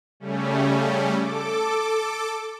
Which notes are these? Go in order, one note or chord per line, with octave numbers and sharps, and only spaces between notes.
C#3 G3 A3 C#4
A4 D6